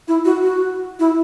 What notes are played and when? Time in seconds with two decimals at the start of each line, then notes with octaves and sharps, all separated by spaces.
0.08 E4
0.25 F#4
0.43 F#4
0.99 E4